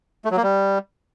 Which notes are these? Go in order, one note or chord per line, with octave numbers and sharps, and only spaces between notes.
A3
F#3
A#3
G3